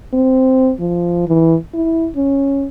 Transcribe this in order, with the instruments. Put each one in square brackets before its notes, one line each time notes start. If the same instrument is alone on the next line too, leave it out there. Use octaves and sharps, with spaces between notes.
[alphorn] C4
F3
E3
E4
C#4